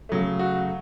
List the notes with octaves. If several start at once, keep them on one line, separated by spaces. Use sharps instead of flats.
C#3 F#3 A3
F#4